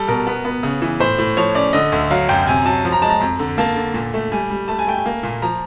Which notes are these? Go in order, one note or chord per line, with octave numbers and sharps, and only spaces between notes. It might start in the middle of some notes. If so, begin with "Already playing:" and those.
Already playing: G3 A4
B2 A#4
B3
B3
C#3
E3
A2 C5
A2
F3 C#5
C#4 D5
D3 D#5
D2
F#3 F5
F#2 G5
C3 G#5
F#3 A5
F3
A#5
G#3 A5
A#5
F2 A#5
D3
A#3 A5
D3
A#2
A3
G3 G#5
G3
A3 A5
G#5
A3 G5
G#5
A#3
A#2
F3 A#5